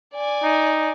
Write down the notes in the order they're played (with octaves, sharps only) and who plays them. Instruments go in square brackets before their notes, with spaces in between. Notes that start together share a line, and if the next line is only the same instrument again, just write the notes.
[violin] D5 G#5
[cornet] D#4